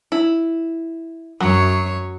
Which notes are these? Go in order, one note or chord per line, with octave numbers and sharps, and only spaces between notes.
E4
F#2 F#3 C#5